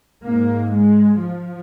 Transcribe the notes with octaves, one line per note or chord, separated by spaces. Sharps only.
G#2 A#3
G#3
F3